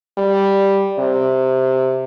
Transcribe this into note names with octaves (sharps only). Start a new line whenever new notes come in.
G3
C3